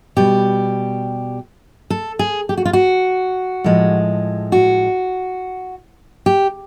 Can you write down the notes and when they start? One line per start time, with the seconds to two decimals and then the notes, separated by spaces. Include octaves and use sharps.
0.16 B2 G3 G4
1.90 A4
2.19 G#4
2.49 G4
2.57 F#4
2.65 F4
2.73 F#4
3.64 A2 F3 G#3
4.52 F#4
6.26 G4